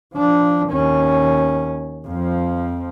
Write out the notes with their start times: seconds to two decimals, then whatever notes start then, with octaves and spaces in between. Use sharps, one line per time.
0.14 F3 D4
0.69 D#2 C#4
2.07 F2 F3